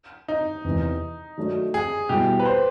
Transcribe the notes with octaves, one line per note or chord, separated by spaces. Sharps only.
D#4
E2 C3 D#3
D#3 F#3 A3 D4 F#4
G#4
B2 G3 B3 E4 G4
B4
C5